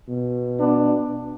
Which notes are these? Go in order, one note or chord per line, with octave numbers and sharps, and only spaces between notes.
B2
B3 D4